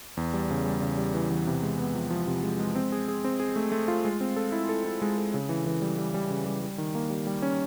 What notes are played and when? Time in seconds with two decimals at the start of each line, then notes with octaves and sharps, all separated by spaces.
0.17 E2
0.34 G3
0.51 C#3
0.66 G3
0.82 C#3
0.98 G3
1.14 E3
1.30 E2
1.47 C3
1.63 G#3
1.79 B3
1.95 F3
2.10 F3
2.27 C3
2.43 G#3
2.59 G#3
2.75 C4
2.92 G#4
3.08 G#4
3.24 C4
3.40 G#4
3.56 A3
3.72 A3
3.88 F4
4.05 G#3
4.21 C4
4.36 A4
4.52 E4
4.69 A4
4.85 E4
5.02 G#3
5.17 A4
5.34 C#3
5.49 E3
5.66 E3
5.82 G3
5.98 G3
6.14 G3
6.31 C#3
6.46 G3
6.62 G3
6.78 D#3
6.95 A#3
7.10 G3
7.27 G3
7.42 C#4